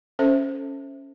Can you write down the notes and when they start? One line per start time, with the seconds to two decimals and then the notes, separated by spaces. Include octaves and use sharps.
0.19 C#4 A4 C5 E5